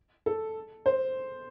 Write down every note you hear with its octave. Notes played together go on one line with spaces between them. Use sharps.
A4
C5